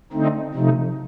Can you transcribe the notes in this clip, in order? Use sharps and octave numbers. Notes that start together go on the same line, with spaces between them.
D3 A3 C4 D#4
C3 F3 A3 D#4